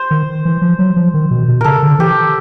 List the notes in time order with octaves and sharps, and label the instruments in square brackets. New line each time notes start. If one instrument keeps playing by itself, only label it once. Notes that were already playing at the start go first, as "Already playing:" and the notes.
Already playing: [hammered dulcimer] C5
[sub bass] D#3
E3
F3
F#3
F3
D#3
B2
B2
[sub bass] C#3 [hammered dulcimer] A4 A#4
[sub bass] D3
[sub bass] E3 [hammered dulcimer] G4